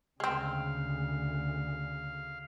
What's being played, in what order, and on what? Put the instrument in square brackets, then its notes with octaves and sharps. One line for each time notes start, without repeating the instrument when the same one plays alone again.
[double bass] D2 C#3 [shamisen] G#3 C4 [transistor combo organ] F5